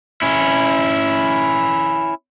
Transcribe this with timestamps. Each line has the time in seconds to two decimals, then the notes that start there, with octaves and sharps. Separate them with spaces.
0.22 C#4 E4